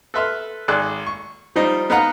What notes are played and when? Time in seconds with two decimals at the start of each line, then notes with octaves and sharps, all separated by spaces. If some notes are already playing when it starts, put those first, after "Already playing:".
0.14 A4 B4 E5 C6 E6 F6
0.68 G#1 G#4 D5 E6 F#6
1.06 C#6
1.56 F3 G3 D#4 C5
1.90 B3 D#4 B4 F5 F#5 A#5